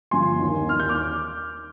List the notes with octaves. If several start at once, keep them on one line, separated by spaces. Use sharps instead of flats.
G1 G2 F3 G#5 C6
D#2 D#3
D#2 D#3 F6
G6
D6 F6